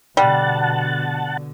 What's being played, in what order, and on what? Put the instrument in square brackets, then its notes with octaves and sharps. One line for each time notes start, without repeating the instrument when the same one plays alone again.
[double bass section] B2 D3 [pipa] G3 [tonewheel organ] F#5 A5